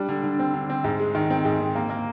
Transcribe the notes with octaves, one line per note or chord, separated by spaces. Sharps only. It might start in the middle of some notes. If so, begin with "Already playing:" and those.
Already playing: G3 D4
D3
D3
C4
D3
C4
G#2
G#3
D#3
C4
G#2
C4
A#3
A#3